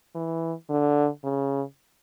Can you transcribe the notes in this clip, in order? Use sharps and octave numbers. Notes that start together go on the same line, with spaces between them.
E3
D3
C#3